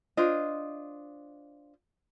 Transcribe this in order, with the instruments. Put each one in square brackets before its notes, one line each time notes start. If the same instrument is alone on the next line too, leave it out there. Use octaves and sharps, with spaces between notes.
[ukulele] D4 F4 C5 D#5